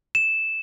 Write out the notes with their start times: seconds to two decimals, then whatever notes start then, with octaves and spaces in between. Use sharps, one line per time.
0.15 E7